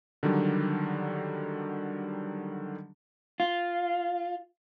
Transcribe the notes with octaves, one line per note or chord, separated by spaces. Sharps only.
D3 D#3 F#3 G3 D4
F4